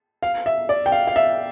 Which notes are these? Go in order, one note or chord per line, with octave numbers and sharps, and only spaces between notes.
F5
E5
D5
G5
F5
F5
E5